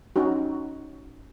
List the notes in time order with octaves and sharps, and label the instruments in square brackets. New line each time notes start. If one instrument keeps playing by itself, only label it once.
[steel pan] C#4 D#4 F#4